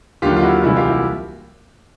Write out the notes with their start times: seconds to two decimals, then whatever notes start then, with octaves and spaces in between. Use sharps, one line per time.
0.22 D#2 D3 F#3 F4 G4
0.36 F4
0.42 E4 F#4
0.62 C2 C3 E3 G3 E4 F#4
0.76 F4 G4
0.89 E4 F#4